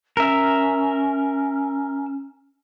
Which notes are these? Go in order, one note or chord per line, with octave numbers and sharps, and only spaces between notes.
C#4 A#4 E5